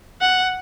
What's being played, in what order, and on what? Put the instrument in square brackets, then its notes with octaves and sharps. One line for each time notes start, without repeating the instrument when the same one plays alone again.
[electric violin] F#5